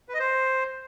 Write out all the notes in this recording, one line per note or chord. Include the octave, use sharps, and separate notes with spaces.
B4
D#5
C5